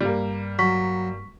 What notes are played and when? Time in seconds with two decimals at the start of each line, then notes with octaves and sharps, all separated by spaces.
0.01 G2 G3 A#3
0.59 F#3 C#6 B6